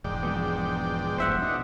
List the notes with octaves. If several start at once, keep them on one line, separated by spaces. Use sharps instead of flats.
E1 G#2 D5 G5
F3 G#3 B3
E1 A1 G2 C5 E5 F#5
B2 D4 D#4